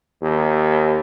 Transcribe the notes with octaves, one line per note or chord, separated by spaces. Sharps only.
D#2